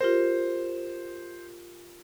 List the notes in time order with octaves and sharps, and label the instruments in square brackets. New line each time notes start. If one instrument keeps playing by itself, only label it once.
[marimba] F4 G4 A#4 [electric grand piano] C5